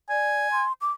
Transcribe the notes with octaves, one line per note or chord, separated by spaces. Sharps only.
D5 G#5
C6
D6